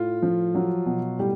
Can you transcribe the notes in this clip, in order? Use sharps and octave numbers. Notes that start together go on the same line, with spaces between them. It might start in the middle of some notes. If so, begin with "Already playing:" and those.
Already playing: A2 F4
F3
F#3
B2
A2 G3 G4